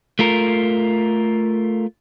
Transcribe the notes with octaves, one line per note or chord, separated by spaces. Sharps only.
A3 F4 A#4